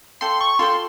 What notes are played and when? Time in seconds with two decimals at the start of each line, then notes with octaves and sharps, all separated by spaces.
0.21 F4 A4 D5 G5 C6
0.41 C#6
0.59 F4 A4 D5 G5 C6